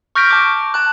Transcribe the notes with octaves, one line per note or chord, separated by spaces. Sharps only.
C#6 F6 G6 A#6 B6 D7
A5 D6
A5 F#6